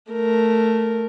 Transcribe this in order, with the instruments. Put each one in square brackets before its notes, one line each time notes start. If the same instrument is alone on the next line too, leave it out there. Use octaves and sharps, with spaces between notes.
[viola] A3 A#4